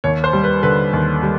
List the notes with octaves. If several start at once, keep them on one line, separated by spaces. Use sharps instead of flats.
D#2 C#5
C5
G3
B4
D3 B4
D#2
G3